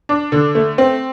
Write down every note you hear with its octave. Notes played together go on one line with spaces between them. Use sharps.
D4
D3
A3
C4